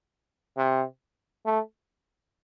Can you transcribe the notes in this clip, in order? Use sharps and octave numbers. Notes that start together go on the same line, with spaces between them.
C3
A3